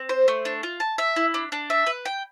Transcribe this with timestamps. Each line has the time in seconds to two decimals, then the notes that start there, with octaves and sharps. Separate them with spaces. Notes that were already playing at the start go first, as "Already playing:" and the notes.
Already playing: C4
0.09 C5
0.28 A3
0.45 D4
0.63 F4
0.80 A5
0.98 E5
1.16 E4
1.34 D4
1.52 D4
1.70 E5
1.86 B4
2.05 G5